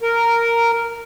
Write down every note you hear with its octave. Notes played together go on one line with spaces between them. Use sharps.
A#4